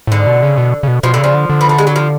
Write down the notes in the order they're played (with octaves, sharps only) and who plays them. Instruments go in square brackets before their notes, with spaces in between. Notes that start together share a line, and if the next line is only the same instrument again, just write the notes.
[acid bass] A2
[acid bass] G#2 [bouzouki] D3
[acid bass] B2
C#3
B2
C#3
B2
[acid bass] B2 [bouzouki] F3
[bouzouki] D3
[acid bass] C#3 [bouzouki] F3
[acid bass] D3
D3
[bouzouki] B3
A3
G#3
F#3
F3